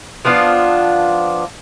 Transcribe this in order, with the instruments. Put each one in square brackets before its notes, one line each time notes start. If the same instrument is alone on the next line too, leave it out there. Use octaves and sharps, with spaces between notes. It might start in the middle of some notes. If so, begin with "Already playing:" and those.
[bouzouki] F3 B3 D4 F4